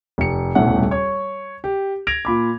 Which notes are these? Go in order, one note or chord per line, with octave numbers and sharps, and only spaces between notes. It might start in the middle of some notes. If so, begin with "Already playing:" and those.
F1 C#7
D#1 C2 B2 A3 E4 F#5
C#5 C#6
G4
G#6 A#6 D7 F7
A#2 B5 D6